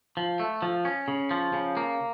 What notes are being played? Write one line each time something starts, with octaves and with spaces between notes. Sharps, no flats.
F3
A3
F3
C#4
C#3
F3
C#3
A#3